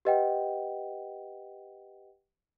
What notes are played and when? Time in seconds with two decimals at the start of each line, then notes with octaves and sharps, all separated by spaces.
0.05 G4 B4 D#5 F#5 G5